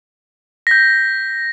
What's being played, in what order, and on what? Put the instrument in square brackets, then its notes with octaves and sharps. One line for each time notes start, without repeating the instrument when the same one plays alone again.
[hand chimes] G6 B6 [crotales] A#6